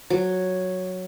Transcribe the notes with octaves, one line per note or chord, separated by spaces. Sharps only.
F#3